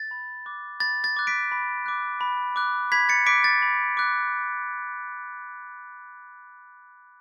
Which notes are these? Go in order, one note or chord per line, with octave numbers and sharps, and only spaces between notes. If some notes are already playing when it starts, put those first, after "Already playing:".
Already playing: A6
B5
D6 F#6
B5 A6
A6
D6 F#6
B6 D7
B5
D6 F#6
B5
D6 F#6
B5 G#6 B6
A6 C#7
D6 F#6 B6 D7
A6
B5
D6 F#6